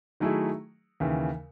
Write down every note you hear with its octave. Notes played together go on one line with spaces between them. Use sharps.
D#3 F#3 A3 E4 G#4
D#2 C#3 E3